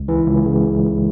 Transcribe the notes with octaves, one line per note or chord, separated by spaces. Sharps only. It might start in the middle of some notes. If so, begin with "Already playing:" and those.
Already playing: C#2
E3
C#2
C#3